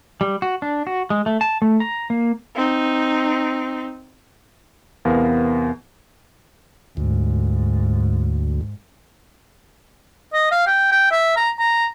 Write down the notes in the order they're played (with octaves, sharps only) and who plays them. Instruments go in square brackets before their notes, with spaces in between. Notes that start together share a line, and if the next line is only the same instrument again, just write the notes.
[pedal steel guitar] G3
F#4
D4
F#4
G#3
A3
A5
A3
A#5
A#3
[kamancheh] C4 D#4
[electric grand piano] E2 C3 B3 A#4 F5
[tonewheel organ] D2 [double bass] G#2
[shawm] D#5
F5
G5
G5
E5
A#5
A#5